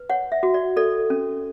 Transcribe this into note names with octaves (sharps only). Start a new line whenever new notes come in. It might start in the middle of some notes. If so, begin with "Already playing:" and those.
Already playing: B4
C#5 F#5
E5
F#4
D5
A4 D5
C#4